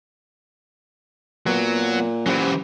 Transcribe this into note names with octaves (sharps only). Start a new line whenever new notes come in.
A#2 F#3 B3
E3 F#3 C#4 G4 C5